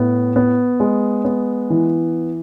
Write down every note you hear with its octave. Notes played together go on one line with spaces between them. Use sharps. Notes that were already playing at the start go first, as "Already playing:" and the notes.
Already playing: A2 B3
B3
G#3
B3
E3